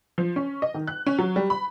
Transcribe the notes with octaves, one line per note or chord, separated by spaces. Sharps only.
F3
C#4
D#5
D#3
F#6
C#4
F#3
G3
B5